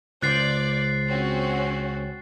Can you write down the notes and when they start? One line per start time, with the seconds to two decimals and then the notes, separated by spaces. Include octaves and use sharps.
0.23 C#2 C5 D5 F#6 G6 A6 C7
1.09 C4 C#4 F#4